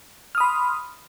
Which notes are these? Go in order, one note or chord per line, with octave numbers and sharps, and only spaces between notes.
B5 C6 D#6 F6